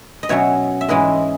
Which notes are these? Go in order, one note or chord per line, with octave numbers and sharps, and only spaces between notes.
D#5
B2 F#3 C#4 C#5 E5
E5
G#2 E3 G#3 C#4 B4 D#5